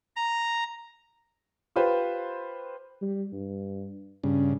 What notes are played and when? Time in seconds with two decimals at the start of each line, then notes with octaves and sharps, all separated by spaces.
0.16 A#5
1.76 F4 G4 B4 C5
3.02 G3
3.32 G2
4.24 G2 C#3 C#4